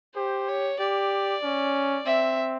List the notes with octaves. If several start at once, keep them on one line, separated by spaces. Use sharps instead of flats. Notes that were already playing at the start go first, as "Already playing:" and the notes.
G4 C5
C#5
G4 D5
C#4
C4 E5